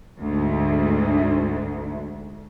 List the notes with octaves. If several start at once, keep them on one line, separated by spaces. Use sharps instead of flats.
D2 G#2